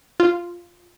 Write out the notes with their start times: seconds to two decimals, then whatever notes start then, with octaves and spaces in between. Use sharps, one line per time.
0.20 F4